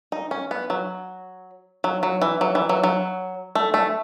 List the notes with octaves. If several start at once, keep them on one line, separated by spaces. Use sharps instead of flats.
D#4
C#4
B3
F#3
F#3
F#3
E3
F#3
E3
F#3
F#3
A3
A3